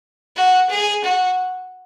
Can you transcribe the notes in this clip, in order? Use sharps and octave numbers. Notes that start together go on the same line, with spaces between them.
F#4
G#4
F#4